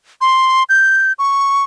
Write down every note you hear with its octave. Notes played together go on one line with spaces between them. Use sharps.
C6
G6
C#6